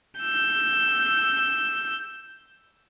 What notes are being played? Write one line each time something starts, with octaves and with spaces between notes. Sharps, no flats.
E6 G6